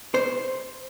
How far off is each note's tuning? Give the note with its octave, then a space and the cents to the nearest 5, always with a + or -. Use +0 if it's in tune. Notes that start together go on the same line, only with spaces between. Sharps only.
C5 +0